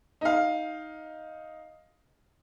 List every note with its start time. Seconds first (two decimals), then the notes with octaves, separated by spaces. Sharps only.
0.21 D#4 F5